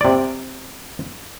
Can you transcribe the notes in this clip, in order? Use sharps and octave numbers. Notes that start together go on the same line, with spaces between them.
C3 D5